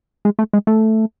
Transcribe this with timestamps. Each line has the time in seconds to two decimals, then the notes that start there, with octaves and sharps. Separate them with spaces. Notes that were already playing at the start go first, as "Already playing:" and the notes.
0.25 G#3
0.39 A3
0.53 G#3
0.67 A3